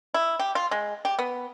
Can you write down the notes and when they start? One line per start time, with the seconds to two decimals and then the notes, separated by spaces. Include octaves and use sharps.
0.14 E4
0.39 G4
0.55 F4
0.71 G#3
1.05 G4
1.19 B3